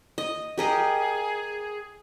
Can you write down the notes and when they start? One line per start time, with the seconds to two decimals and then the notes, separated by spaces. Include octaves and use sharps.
0.18 D#5
0.58 G4 G#4 A#4 D#5